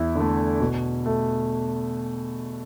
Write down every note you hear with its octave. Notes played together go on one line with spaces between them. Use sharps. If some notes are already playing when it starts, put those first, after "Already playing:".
Already playing: E2 E4
D3
A3
B2
A3